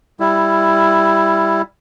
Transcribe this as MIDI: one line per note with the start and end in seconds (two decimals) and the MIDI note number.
0.20 1.62 55
0.20 1.62 64